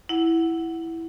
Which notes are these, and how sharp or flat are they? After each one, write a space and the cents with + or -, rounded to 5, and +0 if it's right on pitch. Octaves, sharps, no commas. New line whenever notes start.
E4 +0 F#5 +5